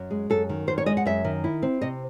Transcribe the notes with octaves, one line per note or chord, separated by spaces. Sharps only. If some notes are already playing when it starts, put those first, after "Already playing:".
Already playing: F#2
G#3
F#2 A4
D#3
F#2 C5
C#5
G#3 D#5
F#5
F#2 E5
D#3
E4
C4
C3 D#5